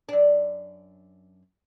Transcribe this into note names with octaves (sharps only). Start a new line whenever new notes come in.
F#2 D4